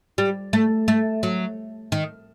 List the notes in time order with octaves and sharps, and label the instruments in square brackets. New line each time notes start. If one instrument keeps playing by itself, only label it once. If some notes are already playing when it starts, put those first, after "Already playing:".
[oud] G3
A3
A3
F#3
D#3